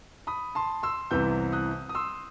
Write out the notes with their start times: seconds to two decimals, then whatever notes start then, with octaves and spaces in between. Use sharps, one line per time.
0.27 B5 D#6
0.55 A5 C6
0.83 C6 E6
1.11 C2 C3 E3 B3 E6 G6
1.52 D#6 F#6
1.89 D#6
1.95 C6 E6